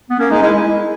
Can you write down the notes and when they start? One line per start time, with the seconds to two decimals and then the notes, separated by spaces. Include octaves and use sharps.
0.10 B3
0.19 A#3 C#4
0.31 G#3 D#4
0.42 G#3 E4